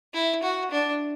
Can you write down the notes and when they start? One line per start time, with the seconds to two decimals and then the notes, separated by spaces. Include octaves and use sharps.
0.14 E4
0.43 F#4
0.71 D4